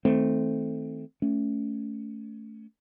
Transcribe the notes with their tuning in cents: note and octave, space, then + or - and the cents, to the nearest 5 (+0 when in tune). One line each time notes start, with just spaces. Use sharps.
D#3 +30 A3 +0 C4 +0
A3 +0 C#4 +20